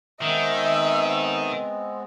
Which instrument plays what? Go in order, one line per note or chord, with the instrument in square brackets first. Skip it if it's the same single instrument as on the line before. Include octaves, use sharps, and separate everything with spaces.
[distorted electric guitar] D#3 [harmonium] G#3 B3 C4 [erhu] E5